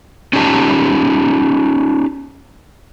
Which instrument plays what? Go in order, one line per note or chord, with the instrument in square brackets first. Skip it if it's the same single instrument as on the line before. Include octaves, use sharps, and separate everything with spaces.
[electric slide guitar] C#4 D#4 F4 G4 A5 A#5